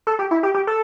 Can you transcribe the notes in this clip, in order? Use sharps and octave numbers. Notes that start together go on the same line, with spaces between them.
A4
G4
E4
G4
G4
A4